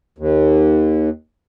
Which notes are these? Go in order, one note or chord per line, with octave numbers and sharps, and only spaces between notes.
D#2